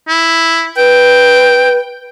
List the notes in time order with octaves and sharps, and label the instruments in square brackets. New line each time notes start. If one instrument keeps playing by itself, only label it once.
[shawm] E4
[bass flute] B4 [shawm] G5